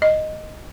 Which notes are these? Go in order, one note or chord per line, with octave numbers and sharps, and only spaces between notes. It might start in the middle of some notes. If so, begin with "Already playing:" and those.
D#5